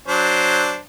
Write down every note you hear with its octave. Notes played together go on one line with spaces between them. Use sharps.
F#3 D4 C5